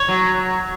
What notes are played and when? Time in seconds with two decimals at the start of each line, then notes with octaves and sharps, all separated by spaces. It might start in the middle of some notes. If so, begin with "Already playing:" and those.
Already playing: C#5
0.08 F#3